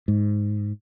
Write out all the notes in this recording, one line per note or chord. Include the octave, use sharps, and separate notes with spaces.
G#2